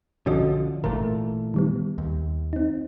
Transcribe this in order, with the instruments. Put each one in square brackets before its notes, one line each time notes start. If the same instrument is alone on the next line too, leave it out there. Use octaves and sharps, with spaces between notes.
[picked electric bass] B1 D3 F3 [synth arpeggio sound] C#4 F#4 D#5
[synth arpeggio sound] G#1 A#4 [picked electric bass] A#2 E3 A3
[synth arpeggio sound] D#3 G3 B3
[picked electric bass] D#2
[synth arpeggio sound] C4 D#4